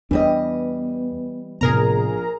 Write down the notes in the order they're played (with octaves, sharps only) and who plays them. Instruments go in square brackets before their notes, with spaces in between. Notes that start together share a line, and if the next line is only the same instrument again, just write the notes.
[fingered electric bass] E2 D4 [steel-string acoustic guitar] E3 G3 D#5 [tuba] B3
[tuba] A#1 [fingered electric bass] A2 C3 B3 [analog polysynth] G#4 A#4 A#5